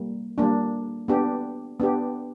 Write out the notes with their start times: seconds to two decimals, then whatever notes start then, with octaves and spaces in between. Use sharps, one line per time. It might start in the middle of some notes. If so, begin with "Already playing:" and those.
Already playing: G3 A#3
0.38 G3 A#3 D4
1.08 B3 D4 G4
1.80 B3 D4 G4